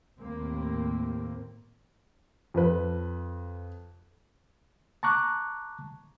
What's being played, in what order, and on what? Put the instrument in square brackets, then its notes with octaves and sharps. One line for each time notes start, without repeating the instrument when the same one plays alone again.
[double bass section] D#2 A2 A#3 C4
[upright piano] F2 B4
[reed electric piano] A5 A#5 C#6 D6 F#6